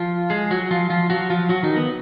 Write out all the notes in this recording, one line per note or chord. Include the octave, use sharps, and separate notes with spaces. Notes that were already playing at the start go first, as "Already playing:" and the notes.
Already playing: F3 F4
G#3 G#4
F#3 F#4
F3 F4
F3 F4
F#3 F#4
F3 F4
F#3 F#4
D#3 D#4
B3